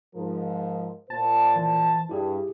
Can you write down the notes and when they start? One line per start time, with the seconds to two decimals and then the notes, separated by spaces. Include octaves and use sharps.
0.15 G#2 F3 A#4
1.10 A#2 C5 A5
1.56 E3
2.09 G2 E4 G4 G#4